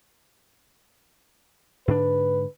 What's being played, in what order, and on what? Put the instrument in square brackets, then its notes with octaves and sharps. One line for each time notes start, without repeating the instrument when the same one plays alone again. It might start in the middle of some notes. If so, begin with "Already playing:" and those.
[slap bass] G#2 D3 D4 [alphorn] B4